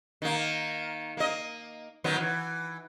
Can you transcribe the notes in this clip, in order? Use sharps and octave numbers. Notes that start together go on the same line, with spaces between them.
D#3 A#3
A#3 D#5
D#3 F#3 B3
E3